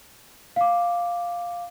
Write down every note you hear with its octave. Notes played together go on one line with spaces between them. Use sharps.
F5 D6